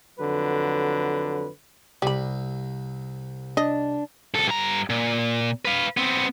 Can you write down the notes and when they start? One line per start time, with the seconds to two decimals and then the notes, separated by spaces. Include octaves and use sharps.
0.20 F2 D3 F#3 B4
2.02 C2 G3 B5
3.57 D4 D#5
4.34 C2 A4
4.47 G2 A#5
4.90 A#2
5.65 B4 F5
5.97 B3 C4